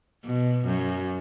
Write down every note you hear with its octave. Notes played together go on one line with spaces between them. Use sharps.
B2
F#2